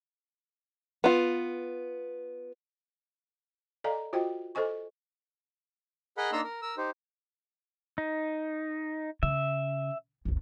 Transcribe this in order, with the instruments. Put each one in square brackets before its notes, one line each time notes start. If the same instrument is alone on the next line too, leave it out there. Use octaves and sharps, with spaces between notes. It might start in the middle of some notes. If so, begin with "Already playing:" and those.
[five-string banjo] B3 F4
[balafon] A4 D5 D#5 F5 G#5 A#5
F4 F#4 C5 D#5 G5
A4 C5 D#5 G#5 C#6
[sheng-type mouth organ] G#4 A#4 D#5 F#5 B5
A#3 D4 D#4 A#5 C6 E6
A#4
A#4 E6
D#4 G4 C5
[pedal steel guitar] D#4
[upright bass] C#3 [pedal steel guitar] E5
[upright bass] F#1 C#2